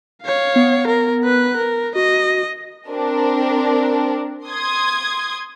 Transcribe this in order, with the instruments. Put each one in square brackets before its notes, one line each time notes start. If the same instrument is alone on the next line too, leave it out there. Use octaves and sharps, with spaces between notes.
[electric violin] C#5 F5
[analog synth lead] B3
[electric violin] A#4
B4 F#6
A#4
[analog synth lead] F#4 [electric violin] D#5
[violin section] C4 D4 A#4
C6 D#6 G#6